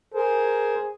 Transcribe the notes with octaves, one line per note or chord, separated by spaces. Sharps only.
G#4 A#4 C5